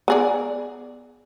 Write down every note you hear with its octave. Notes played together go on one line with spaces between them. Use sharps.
B3 G#4 D5